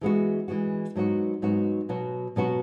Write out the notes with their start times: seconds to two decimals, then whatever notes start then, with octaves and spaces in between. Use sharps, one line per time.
0.01 E3 G#3 B3 F#4
0.48 E3 G#3 B3 F#4
0.96 G#2 F#3 B3 F#4
1.42 G#2 F#3 B3 F#4
1.89 B2 F#3 B3 F#4
2.36 B2 F#3 B3 F#4